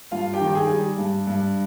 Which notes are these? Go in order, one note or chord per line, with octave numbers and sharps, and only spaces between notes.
G2 F4 F5
G4 G5
D#3
G5
G#4 G#5
G3
G2
G2